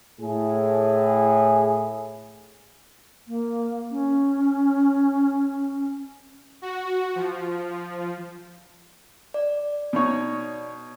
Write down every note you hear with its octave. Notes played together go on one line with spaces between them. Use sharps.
A2 G#4
A#3
C#4
F#4
F3
D5
B2 D#4 C#5